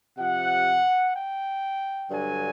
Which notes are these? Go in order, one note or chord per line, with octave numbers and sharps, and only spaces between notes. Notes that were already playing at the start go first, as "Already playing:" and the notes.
C3 F3 F#5
G5
G2 D3 F#3 G#5